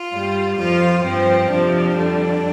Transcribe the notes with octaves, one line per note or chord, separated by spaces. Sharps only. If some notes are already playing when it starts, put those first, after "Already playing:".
Already playing: F4
G2 G3
F2 F3 F4
G2 F3 C4
F2 C3 F3 D4
F2 D3 G3